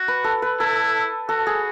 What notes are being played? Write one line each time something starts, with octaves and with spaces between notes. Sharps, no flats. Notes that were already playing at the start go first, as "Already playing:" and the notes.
Already playing: F#4
B4
A4
B4
E4 A4
F#4 A4
G#4